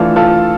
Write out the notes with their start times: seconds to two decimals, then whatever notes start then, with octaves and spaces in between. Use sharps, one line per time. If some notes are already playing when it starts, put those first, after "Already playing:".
Already playing: E3 A3 D4 F4 A4
0.16 F4 A4